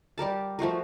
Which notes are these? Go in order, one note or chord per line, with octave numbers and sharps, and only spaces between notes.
G3 G4 A#4 A5
F3 A3 F#4 A#4